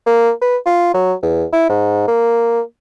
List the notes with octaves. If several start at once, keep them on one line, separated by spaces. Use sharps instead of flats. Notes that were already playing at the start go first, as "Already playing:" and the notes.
A#3
B4
F4
F#3
E2
E4
G#2
A#3